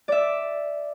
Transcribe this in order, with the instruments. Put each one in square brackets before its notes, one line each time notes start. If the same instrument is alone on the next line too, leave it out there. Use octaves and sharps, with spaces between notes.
[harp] D5 E5